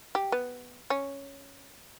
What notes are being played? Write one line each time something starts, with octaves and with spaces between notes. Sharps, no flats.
G4
B3
C#4